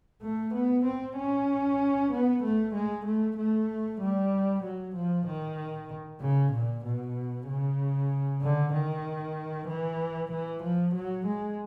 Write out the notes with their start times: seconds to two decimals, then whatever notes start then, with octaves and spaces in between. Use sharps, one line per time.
0.22 A3
0.54 B3
0.85 C4
1.17 C#4
2.11 B3
2.43 A3
2.74 G#3
3.05 A3
3.37 A3
4.01 G3
4.63 F#3
4.95 F3
5.27 D#3
6.21 C#3
6.53 A#2
6.85 B2
7.48 C#3
8.42 D3
8.73 D#3
9.68 E3
10.31 E3
10.63 F3
10.94 F#3
11.26 G#3